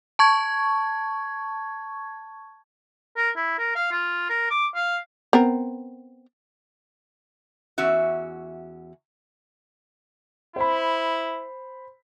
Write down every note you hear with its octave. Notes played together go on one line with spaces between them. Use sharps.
A5 C#6 G#6
A#4
E4
A#4
F5
F4
A#4
D6
F5
B3 C4 A#4
E2 C#4 F#4 E5
E4 C5 B5